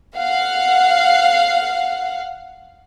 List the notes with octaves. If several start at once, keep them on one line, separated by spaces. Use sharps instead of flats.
F5 F#5